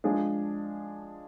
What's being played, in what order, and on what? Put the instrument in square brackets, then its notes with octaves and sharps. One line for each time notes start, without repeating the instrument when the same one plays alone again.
[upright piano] F3 G#3 D4 G#4